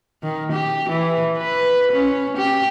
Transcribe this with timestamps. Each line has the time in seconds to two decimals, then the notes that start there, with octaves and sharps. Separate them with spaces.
0.23 D#3
0.52 G4
0.89 E3
1.37 B4
1.92 C#4
2.37 G4